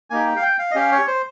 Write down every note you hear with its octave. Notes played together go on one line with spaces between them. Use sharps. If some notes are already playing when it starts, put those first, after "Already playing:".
A#3 D#4 G4 G#5
G5
F5
G5
F5
D#5
C#4 G4 F5
C#5
C5